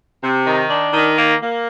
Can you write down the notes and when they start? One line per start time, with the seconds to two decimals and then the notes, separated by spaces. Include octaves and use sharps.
0.22 C3
0.47 D#3
0.69 D4
0.93 D#3
1.17 A#3
1.40 A#3